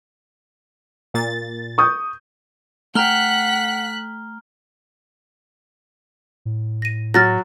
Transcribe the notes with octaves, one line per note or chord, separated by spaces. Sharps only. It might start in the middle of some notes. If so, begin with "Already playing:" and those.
A#2 A6
C#6 D#6 G6
A3 F#5 G5 A#5 F6 F#6 B6 G7
A2
A#6 D#7
F#3 F6 A6 A#6